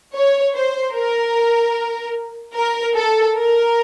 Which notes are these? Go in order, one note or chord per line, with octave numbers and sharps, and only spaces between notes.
C#5
C5
A#4
A#4
A4
A#4